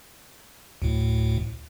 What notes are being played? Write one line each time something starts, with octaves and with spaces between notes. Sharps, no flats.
D2 A2